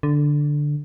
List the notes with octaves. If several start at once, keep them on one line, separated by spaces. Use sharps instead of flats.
D3